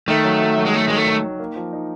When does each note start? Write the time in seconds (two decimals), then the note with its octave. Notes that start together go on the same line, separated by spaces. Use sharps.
0.08 D#3 A3
0.24 F#3
0.41 F#3
0.57 F#3
0.66 G#3
0.74 F#3 A3
0.88 D#3 G#3
0.96 A3
1.07 D#3
1.23 D#3
1.39 A#3
1.56 F3
1.73 D#4